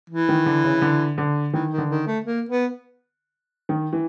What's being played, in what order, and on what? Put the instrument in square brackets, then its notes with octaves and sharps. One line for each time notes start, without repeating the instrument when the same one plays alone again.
[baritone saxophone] E3
[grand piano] D#3
D3
C#3
D3
D3
[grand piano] D#3 [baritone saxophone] E3
[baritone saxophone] D#3
[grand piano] D3
[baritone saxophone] D#3
A3
A#3
B3
[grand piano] D#3
E3